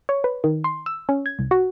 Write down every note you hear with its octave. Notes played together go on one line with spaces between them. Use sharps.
C#5
B4
D#3
C6
E6
C#4
G#6
C2
F#4